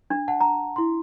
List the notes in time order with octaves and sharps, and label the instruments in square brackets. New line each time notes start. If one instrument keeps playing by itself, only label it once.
[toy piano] D4
[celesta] F#5 A5
[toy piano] A#5
[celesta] E4 C6